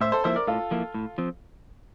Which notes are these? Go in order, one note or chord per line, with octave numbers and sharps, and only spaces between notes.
A2 C5 E5
A4 C5
F3 A#3 E4 C5 E5
A#4 D5
A2 F4 A4
F3 A#3 E4
A2
F3 C4